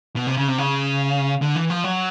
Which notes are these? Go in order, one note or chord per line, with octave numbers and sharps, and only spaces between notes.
B2
C3
C#3
C3
C#3
D3
E3
F3
F#3